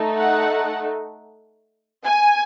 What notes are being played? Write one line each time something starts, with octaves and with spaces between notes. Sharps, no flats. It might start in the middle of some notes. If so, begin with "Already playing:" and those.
Already playing: A3 D#4 A4
F#5
G#5